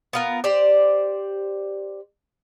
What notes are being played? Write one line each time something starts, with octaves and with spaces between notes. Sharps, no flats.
B3 F4 A#4
G4 C5 D5